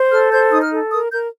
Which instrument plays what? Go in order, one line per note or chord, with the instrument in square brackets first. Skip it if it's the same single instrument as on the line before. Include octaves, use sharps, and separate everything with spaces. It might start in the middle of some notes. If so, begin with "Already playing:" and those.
Already playing: [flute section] C5
A4 F6
C5 G6
D#4 D#6
F6
A4
A#4 D#6
A#4 G6